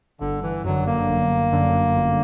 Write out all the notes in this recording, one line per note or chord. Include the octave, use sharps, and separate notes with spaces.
G1 D3
E3
F#2 D3 F#3
A#3
G1
F#2 D3
G1